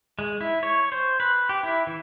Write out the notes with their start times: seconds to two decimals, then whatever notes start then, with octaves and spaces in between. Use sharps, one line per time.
0.19 G#3
0.41 E4
0.63 C#5
0.92 C5
1.20 B4
1.49 G4
1.63 E4
1.87 E3